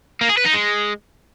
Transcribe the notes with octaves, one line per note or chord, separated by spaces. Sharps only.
A#3
G#4
B4
D#4
G#3